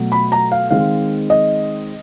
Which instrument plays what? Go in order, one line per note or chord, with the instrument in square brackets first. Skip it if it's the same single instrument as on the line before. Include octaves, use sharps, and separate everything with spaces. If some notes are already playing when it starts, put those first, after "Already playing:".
Already playing: [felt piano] B2 F#3 A3
B5
A#5
F5
D#3 G#3 C4 F5
D#5